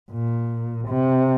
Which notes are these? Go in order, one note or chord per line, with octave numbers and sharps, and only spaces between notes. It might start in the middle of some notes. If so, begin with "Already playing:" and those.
A#2
C3